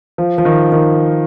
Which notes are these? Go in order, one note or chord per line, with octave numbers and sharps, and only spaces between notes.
F3
F3
D#3
D#3